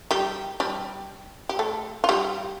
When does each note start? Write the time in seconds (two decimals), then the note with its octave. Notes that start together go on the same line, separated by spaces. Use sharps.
0.11 G3 G4
0.60 G3 G4
1.49 G4
1.59 A3 A4
2.04 F4
2.09 G3 G4